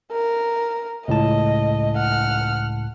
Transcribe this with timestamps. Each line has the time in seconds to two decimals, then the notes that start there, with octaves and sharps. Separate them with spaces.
0.12 A#4
1.08 C#2 A2 D#5 A5
1.98 F#5 F6